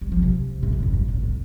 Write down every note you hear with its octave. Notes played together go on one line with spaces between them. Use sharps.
G3
F3
C3
A2
G2
F2
G2
A2
C3